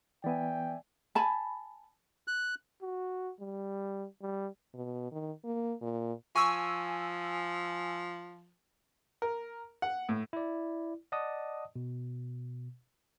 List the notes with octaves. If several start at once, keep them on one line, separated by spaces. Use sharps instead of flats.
E3 B3 D5 E5 G5 G#5
G#5 A5 B5
F#6
F#4
G3
G3
B2
D#3
A#3
A#2
F3 G#5 C#6 E6
A#4
F#5
A2
E4 D5
D5 D#5 F#5 A5 D#6
B2